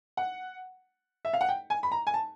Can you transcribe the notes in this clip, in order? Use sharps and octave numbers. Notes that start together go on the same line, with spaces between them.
F#5
E5
F5
F#5
G5
G#5
B5
A#5
G#5
A5